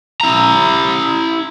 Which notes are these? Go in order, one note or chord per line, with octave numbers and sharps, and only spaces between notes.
E4 A#5